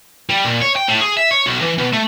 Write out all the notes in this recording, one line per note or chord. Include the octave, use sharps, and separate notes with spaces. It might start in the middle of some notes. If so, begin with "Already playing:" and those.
G3
A#2
C#5
G5
A2
G#4
E5
C#5
B1
E3
B2
A3